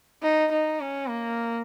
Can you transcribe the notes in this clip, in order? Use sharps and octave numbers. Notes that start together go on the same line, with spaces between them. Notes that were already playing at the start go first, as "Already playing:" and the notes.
D#4
D#4
C#4
A#3